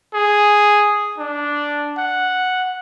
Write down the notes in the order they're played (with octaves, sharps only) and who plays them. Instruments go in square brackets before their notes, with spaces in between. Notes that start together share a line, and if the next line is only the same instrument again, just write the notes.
[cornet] G#4
D4
F#5